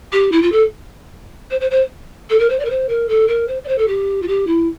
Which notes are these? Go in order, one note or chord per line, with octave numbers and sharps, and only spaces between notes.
G4
E4
F4
A4
C5
C5
C5
A4
A#4
C5
D5
A#4
C5
A#4
A4
A#4
C5
D5
C5
A4
G4
F4
G4
E4